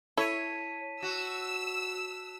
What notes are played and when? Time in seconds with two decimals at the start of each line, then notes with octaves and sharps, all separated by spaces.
0.17 E4 A4 C#5 A5 B6 D#7
1.03 F#4 E6